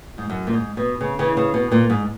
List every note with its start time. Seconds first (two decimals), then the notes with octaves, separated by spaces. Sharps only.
0.18 G#2
0.30 F#2
0.47 A#2
0.53 G#2
0.77 B2
1.01 C#3
1.19 C#3 E3
1.37 C#3
1.54 B2
1.72 A#2
1.90 G#2